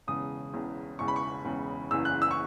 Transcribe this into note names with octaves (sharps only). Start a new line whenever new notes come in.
E1 E2 C#3 D#6
E1 E2 C#3
E1 E2 C#3 C#6
B5
C#6
E1 E2 C#3
F#1 E2 C#3 E3 E6
F#6
E6
C#6